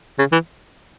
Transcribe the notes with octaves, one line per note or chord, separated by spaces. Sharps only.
C#3
E3